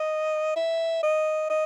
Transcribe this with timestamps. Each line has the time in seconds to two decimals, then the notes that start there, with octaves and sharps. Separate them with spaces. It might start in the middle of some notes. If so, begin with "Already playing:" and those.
Already playing: D#5
0.56 E5
1.03 D#5
1.50 D#5